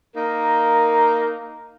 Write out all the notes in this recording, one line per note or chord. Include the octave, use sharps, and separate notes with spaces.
A#3 D#4 A#4